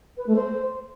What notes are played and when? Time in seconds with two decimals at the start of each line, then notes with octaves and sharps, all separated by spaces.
0.17 B4
0.26 A3
0.35 C5